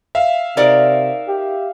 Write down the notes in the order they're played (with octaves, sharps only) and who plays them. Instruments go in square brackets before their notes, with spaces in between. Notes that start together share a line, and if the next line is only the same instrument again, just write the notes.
[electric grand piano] E5 F5
[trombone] C3 [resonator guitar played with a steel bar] D#4 A#4 D5
[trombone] G4